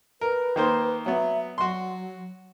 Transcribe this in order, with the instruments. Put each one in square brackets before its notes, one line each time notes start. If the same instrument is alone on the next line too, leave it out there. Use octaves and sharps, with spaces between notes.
[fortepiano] A#4 [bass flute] B4
[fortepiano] D#3 A#3 C5
[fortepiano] F#3 B3 [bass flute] E5
[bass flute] F#3 [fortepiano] F#4 C6